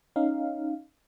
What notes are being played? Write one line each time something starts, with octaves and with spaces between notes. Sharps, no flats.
C#4 D#4 F5